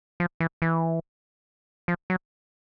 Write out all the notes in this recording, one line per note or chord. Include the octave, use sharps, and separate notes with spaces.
F3
E3
E3
F3
F#3